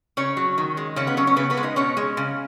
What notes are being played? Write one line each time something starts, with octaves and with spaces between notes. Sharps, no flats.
C#3 C#4 C#5
F#3
D#3
G#3
C#3 C#4 C#5
B3 B4
F#3 C#4 C#5
C#4 C#5
C#3 B3 B4
B3 B4
G#3
D#4 D#5
B2 C#4 C#5
G#3
C#3